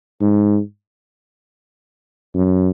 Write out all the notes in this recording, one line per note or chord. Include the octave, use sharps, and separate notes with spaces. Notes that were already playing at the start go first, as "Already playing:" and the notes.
G#2
F#2